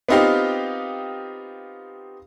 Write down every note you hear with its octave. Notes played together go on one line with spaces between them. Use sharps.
B3 C4 D#4 F4 G4 F5